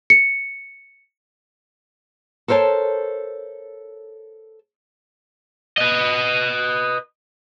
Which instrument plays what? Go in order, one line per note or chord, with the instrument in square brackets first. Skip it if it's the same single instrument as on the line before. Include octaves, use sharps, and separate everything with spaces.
[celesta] C#7
[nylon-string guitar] A4 A#4 C5 C#5 A5
[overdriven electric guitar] B4 D#5